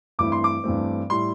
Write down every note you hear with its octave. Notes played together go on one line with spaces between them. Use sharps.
G2 E3 A3 C4 E4 D6
C6
D6
G2 E3 A3 C4
A2 G3 E4 C6